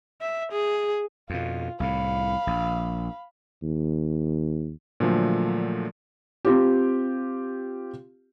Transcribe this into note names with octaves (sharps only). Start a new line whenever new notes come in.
E5
G#4
F2 B2 F4
C2 A2 F5 B5
A#1
D#2
A#2 D3 F3 F#3 A3
C4 F4 G4